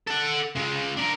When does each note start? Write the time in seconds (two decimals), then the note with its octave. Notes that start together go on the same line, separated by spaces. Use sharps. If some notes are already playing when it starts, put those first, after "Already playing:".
0.07 A4 F#5
0.56 C#3 G#3
0.97 D4 A#4